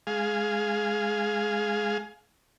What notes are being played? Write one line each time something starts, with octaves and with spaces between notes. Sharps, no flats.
G#3 G#4 F5